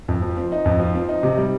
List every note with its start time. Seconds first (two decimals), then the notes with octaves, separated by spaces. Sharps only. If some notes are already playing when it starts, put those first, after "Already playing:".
0.08 F2
0.22 F3
0.37 C4
0.52 D#4
0.65 F2
0.80 F3
0.95 C4
1.09 D#4
1.23 C3
1.38 G3